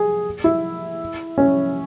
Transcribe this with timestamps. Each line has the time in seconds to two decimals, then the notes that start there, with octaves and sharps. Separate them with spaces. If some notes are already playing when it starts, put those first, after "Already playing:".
Already playing: G#4
0.44 E4
1.38 C#4